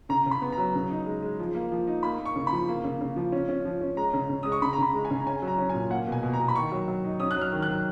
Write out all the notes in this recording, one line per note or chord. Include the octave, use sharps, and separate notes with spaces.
C#3 A#5
C#3
B5
B3
A#5
F#3
C#3
D#4
G#3
G#3
F3
A#3
F3
D#4
A#3 B5
A#3
C#6
C#3
B5
F3
A#3
C#3
C#3
F3
C#4
C#4
F3
C#4
G#3 A#5
C#3
C#3
G#3 D#6
C#6
C#3 B5
A#5
C#3 B5
G#3
G#5
C#3
A#5
C#4 G#5
F#3
A#5
C#4
G#5
A#2
A#3 F#5
B2
G#5
B2
A#5
B2
B5
D#3 C#6
F#3
F#3
D#4
C#4 D#6
F#3 F#6
F6
D#3
F#6
F#3